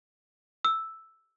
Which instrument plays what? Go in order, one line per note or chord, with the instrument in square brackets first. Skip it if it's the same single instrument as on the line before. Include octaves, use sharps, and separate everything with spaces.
[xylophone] E6